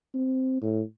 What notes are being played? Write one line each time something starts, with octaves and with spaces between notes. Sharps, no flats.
C4
A2